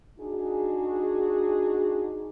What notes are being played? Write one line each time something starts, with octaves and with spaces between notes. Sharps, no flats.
D4 D#4 F#4 G#4